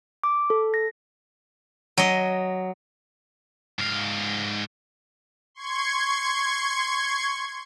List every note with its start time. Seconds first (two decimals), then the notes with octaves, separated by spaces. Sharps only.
0.24 D6
0.50 A4
0.74 A#6
1.98 F#3 D#5
3.79 G#2 F5
5.55 C6 C#6 G#6